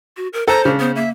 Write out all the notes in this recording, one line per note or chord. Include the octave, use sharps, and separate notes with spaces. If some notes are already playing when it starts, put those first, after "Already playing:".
F#4
A#4
A4 C5 A#5
C#3 D4
B3 C5
A#3 E5